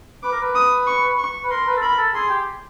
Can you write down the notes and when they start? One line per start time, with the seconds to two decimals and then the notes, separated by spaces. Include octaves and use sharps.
0.23 B4 D6
0.32 A#4
0.42 B4
0.55 D#6
0.87 C#6
1.18 C#6
1.44 B4
1.51 A#4 C6
1.67 B4
1.77 A4
1.82 A#4 B5
1.98 A4
2.14 G#4 C6
2.30 G4